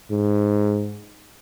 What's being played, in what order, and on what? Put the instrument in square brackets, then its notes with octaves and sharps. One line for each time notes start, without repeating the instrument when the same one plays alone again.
[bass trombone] G#2